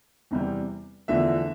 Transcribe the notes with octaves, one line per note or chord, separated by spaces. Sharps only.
E2 C3 G3
E2 D3 F3 A3 E5